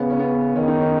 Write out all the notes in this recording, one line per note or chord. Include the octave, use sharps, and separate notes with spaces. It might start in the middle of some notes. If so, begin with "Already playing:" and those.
Already playing: C#3 B3
C#4
B3
D#3 C#4
D#4
C#4